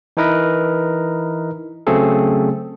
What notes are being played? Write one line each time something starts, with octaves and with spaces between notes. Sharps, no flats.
E3 D#4 E4 A#4 B4 D#5
C#3 F#3 A3 C4 G#4 A4